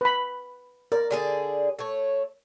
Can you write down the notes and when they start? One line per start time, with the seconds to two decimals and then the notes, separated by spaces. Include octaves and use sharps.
0.01 B4 B5
0.92 A#4 D5
1.11 D3 G#4 D5
1.79 A3 C#5